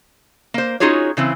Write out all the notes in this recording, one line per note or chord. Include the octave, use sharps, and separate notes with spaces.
A#3 C5
C#4 D#4 F4 F#4 G#4 C#5
C#3 E3 C4